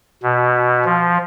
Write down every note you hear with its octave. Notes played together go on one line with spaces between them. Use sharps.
B2
F3